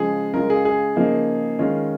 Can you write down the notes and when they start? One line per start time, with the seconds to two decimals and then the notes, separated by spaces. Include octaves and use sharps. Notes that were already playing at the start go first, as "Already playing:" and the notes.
Already playing: C#3 F3 G#3 G#4
0.34 C#3 G#3 F4 A#4
0.50 G#4
0.65 G#4
0.96 C#3 F3 A#3 D#4
1.59 D#3 G#3 C#4 F4